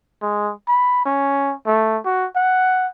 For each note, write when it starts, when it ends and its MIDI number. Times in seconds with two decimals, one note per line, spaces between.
0.22 0.52 56
0.68 1.04 83
1.05 1.54 61
1.67 1.98 57
2.05 2.28 66
2.35 2.88 78